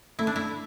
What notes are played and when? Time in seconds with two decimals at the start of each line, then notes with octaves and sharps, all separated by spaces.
0.19 A3 E4
0.27 D4
0.36 E4